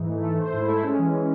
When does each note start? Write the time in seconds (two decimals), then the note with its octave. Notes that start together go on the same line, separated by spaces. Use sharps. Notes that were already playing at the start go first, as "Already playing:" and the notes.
Already playing: G#2 E3 D#4
0.09 A3
0.23 A3
0.38 A3 C5
0.53 G#2 E4
0.68 A3 E4
0.83 G#3 C#4
0.99 E3
1.13 E3